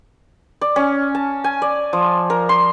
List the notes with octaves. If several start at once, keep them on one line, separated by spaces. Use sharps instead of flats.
D5
C#4
A5
G#5
D5
F3
A#4
C6